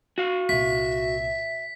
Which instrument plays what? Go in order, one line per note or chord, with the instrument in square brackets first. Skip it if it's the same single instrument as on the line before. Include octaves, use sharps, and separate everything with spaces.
[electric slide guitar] F#4 F5
[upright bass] C2 A#2 [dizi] E5 [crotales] B6